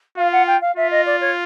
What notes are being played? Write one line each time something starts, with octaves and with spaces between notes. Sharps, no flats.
F4 F5
F#5
G5
F5
F4 E5
D#5
D5
C#5